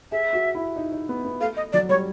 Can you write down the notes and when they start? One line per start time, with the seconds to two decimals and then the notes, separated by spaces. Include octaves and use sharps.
0.12 G#4 E5
0.33 F#4
0.55 E4
0.76 D#4
0.92 D#4
1.09 B3
1.25 B3
1.41 A3 F5
1.57 D#5
1.73 F#3 D5
1.89 G3 C#5